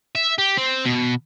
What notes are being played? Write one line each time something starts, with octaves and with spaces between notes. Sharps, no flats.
E5
G4
C4
B2